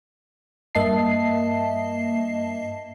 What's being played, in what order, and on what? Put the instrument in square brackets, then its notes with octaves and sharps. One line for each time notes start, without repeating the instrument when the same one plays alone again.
[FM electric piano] G2 A#3 D#5 E5 A5 C7